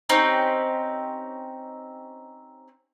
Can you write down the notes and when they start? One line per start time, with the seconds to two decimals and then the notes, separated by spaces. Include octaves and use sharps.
0.09 C4 C#4 D#4 G4